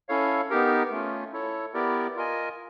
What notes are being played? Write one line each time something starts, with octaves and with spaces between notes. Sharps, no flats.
C#4 E4 A4 C#5 F5
B3 D#4 G4 A#4
A3 C#4 F4
E4 A4 C#5
B3 E4 G4 A#4 D5
F4 A#4 D#5 G#5